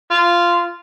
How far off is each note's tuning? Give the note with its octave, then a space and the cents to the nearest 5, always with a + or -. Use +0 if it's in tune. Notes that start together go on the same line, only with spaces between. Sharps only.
F4 -10